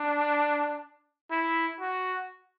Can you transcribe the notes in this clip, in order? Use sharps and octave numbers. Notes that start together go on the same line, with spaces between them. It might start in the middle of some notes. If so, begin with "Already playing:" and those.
Already playing: D4
E4
F#4